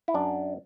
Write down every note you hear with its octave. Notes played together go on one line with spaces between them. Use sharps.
E4
F#2 D4